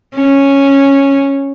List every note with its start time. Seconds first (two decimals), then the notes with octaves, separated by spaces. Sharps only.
0.16 C#4